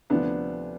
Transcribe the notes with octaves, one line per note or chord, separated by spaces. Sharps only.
D2 C3 F3 B3 D4